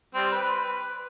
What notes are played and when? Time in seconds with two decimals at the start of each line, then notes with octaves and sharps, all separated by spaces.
0.15 G3 C4
0.32 B4